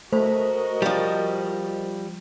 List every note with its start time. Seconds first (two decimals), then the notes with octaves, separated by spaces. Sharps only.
0.13 A3 F#4 A#4 C5 D#5
0.82 F3 G3